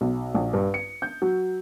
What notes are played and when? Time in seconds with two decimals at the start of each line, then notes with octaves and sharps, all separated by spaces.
0.01 B1
0.34 A#1
0.53 G2
0.74 C#7
1.02 G6
1.22 F#3